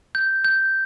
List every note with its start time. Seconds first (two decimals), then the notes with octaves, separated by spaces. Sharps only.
0.15 G6
0.45 G6